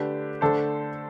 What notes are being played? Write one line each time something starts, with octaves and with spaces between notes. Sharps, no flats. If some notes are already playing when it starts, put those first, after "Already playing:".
Already playing: D3 A3 D4 G4 B4
D3 A3 D4 A4 C5